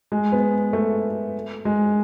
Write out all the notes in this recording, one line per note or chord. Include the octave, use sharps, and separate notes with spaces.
G#3
B3
A3
G#3